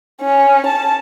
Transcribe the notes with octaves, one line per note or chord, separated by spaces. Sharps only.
C#4
A5